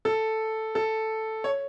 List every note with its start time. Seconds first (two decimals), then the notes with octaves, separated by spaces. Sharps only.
0.05 A4
0.75 A4
1.44 C#5